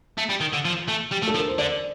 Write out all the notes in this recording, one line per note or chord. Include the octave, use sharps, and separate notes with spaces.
A3
G3
D#3
D3
F3
A3
G3
A3
A4
F3 A#4
C5
D3 D5